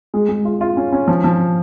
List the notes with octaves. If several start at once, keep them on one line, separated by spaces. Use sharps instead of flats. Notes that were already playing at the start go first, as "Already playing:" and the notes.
G#3
G#3
F4
F4
C#4
C#4
F3
F3